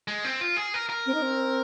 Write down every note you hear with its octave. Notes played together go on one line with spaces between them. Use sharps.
G#3
C4
F4
G#4
A#4
A#4
C4
D#4
C4